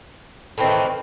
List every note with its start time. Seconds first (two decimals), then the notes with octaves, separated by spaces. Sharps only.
0.58 A2
0.60 C4
0.63 D#3
0.65 E3